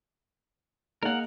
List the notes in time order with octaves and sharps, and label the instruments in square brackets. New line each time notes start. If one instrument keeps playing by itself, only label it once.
[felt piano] A#3 D#4 G#4 [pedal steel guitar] A#4 F#5